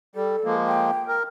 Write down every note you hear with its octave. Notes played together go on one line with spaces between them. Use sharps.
G3 A4
F3 G#3 A#3
G5
A#4